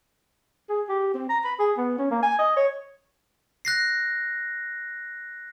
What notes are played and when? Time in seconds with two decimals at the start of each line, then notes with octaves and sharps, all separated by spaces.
0.69 G#4
0.89 G4
1.14 C4
1.29 A#5
1.44 B5
1.59 G#4
1.77 B3
1.98 C#4
2.11 A#3
2.23 G#5
2.39 D#5
2.57 C#5
3.65 F#6 A#6 C7